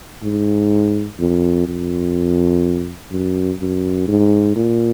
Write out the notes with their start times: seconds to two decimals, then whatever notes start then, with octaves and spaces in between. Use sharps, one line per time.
0.23 G#2
1.19 F2
1.66 F2
3.11 F#2
3.60 F#2
4.08 G#2
4.56 A#2